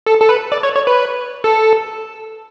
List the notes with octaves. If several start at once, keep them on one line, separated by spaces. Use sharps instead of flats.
A4
A4
B4
D5
C#5
C#5
B4
A4